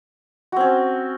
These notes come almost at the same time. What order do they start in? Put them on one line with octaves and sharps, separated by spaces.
F#4 C4 C#4